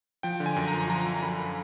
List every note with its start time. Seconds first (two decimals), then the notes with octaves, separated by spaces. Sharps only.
0.23 F3 G5
0.40 D3
0.46 G#5
0.56 F#2
0.68 A#5
0.74 F3
0.90 F3 A#5
1.07 F3
1.15 A#5
1.22 F#2 B5
1.45 B5